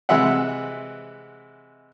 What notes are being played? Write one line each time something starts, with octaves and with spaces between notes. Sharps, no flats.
C3 E3 G#3 E5 F#5